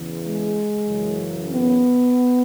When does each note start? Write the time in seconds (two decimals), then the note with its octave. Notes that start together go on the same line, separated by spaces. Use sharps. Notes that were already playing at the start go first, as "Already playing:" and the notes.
Already playing: E2 C#3 E3
0.25 G#3
0.88 F#2 C#3 E3
1.51 B3